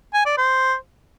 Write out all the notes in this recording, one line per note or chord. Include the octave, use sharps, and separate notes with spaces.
G#5
D5
C5